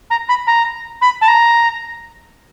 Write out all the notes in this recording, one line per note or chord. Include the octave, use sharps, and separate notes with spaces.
A#5
B5
A#5
B5
A5
A#5